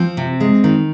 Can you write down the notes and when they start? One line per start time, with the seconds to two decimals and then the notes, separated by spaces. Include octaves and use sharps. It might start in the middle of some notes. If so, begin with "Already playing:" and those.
Already playing: F3 C4
0.17 C3
0.40 G#3
0.64 D#3